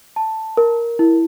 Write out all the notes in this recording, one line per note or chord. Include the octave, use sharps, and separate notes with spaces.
A5
A#4
E4